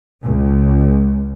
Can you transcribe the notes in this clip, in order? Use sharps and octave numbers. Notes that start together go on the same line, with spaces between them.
C#2